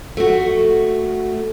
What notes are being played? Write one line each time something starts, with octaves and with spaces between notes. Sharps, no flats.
A3 F#4